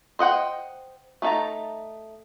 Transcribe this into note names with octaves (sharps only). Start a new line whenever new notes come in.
C5 D#5 F#5 G5
A3 D#4 A4 A5 A#5